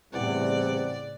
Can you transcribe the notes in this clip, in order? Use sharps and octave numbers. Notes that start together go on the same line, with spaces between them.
E2 A2 C#3 E3 G3 C4 D5 F#5